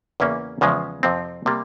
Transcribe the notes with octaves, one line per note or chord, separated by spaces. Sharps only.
E2 C#3 E3 A#3 C#4
E2 C#3 F3 G#3
F2 C3 F3 C4
C3 G3 A#3